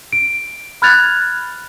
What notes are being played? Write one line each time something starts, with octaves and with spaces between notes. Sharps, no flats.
D7
B5 F6 F#6 G#6 A6 F7